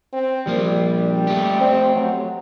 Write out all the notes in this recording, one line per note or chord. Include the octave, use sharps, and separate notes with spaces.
C4
F3 G3 A#3
A3 G4
C4
F#3